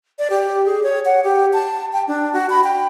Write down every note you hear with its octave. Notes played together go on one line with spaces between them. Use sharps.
D5
G4
G#4
C#5
F#5
G4
A5
G5
D4
F#4
B5
G5